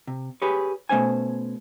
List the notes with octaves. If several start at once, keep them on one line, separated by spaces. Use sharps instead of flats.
C3
G4 G#4 B4 C#5
B2 A3 C#4 C5 G#5